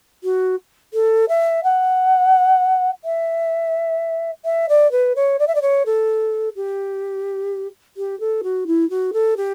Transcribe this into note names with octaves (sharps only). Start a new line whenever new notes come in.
F#4
A4
E5
F#5
E5
E5
D5
B4
C#5
D5
E5
D5
C#5
A4
G4
G4
A4
F#4
E4
F#4
A4
G4